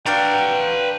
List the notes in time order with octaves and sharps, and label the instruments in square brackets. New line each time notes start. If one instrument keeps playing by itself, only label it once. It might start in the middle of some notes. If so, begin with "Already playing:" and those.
[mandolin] D4 F#4 F5 [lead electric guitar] B4 A#5 [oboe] G5